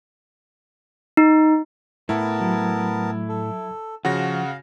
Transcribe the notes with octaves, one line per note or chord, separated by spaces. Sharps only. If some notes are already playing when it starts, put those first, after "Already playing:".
D#4
A2 A3 B3 E4 A#4 A5
F#3
A4
C#3 F3 F#4 F5 F#5 A#6